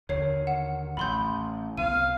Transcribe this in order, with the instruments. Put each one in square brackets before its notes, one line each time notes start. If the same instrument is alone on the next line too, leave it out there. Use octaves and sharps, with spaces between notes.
[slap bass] D#2 D3 D#3 [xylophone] C#5 C7
[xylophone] F#5
[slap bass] A1 [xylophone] B5 C6 G6
[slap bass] C2 B3 [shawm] F5 [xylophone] D#7